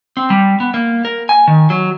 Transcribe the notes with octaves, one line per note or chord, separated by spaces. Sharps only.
C4
G3
B3
A#3
A#4
G#5
D#3
F#3